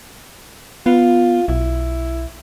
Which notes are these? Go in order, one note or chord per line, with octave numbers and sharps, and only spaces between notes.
B3 F4
B1 E4